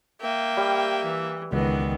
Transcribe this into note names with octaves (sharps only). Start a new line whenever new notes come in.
A#3 E5 G5
G3
E3
C#2 D#3 E3 B3